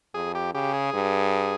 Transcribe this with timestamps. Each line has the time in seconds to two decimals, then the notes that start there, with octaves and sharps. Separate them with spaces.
0.14 F2 G#4
0.35 G4
0.54 C#3 G4
0.73 G#4
0.94 G2